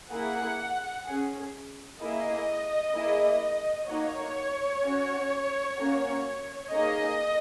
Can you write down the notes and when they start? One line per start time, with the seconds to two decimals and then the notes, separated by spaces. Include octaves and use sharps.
0.11 A#3 E4 G#4 F#5
1.06 C#4 G#4
2.01 A#3 E4 G#4 D#5
2.95 A#3 E4 G#4
3.89 A#3 D#4 F#4 C#5
4.84 C#4 F#4
5.79 A#3 C#4 F#4
6.72 A#3 D#4 G#4 D#5